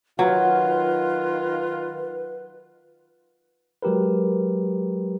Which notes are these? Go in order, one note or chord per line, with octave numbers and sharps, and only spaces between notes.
D#3 F#3 F4 B4 F#5
F#3 G#3 G4 A#4 B4